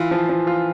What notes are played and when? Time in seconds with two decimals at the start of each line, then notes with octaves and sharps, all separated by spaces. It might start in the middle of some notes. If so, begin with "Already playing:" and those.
Already playing: E3 F4
0.11 F3
0.29 F3
0.47 F4